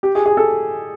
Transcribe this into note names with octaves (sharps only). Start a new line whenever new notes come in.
G4
G#4
G#4
A4